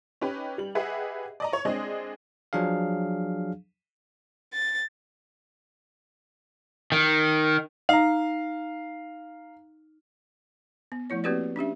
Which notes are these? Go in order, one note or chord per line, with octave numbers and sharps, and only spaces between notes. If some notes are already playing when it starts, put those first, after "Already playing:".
C#4 D#4 G4 B4
G3 F#7
G4 G#4 B4 D#5 E5 F#5
D5 D#5 A#5
C#5 C#6
G#3 C4 D4 G#4 D#5
F3 F#3 D4 G#4 F5
A6
D#3
D#4 F5 A#5
B3
F3 A3 E4 C#5
A#3 C4 F#4 G4 B4 D5
C#4 D4 G4 E5